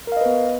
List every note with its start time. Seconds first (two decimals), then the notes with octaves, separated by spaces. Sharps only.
0.07 A#4
0.12 F5
0.17 D#5
0.21 B4
0.26 B3